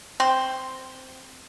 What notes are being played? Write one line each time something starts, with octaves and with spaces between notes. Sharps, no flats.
C4 C5